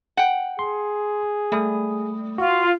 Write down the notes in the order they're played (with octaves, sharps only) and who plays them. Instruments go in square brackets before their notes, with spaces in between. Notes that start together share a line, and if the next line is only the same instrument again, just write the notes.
[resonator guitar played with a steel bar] F#5 G5
[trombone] G#4 [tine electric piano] C6
[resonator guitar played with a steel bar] G3 [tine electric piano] A3 D#6
[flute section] F4 [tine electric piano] F#4